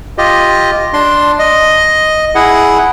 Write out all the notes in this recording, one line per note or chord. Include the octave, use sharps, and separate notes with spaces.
F4 G4 D#5
D4 C6
D#5
E4 G#4 F#5